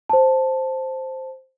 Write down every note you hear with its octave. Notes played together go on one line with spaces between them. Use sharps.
C5 A5